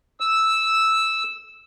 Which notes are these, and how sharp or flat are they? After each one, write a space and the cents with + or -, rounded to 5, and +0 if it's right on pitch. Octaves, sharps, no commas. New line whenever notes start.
E6 -5